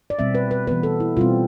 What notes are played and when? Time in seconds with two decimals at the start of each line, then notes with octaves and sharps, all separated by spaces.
0.10 D5
0.19 B2 G3 C4 E5
0.35 B4
0.51 B4
0.67 E3 B3 B4
0.83 A4
1.00 E4
1.17 B2 G3 C4 F4